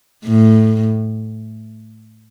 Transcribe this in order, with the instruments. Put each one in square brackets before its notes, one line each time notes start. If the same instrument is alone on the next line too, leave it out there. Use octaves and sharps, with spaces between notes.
[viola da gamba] A2